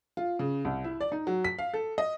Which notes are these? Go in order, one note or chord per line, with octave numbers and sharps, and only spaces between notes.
F4
C#3
C2
E4
D5
D#4
F#3
B6
F5
A4
D#5